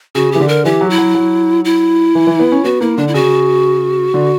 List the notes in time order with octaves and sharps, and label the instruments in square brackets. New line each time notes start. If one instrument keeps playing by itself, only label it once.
[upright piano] C#3 [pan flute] F#4
[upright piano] E3 [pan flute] G4
[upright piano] D3
[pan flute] A#4
[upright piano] E3 [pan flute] G4
[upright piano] F#3
[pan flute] E4
[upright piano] F#3
F#3
[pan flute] E4
[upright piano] E3
E3
B3
C#4
[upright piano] B3 [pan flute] F#4
[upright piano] A#3 [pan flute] E4
[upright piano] D3 [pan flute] D4
[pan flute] E4
[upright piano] C#3 [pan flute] F#4
[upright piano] D3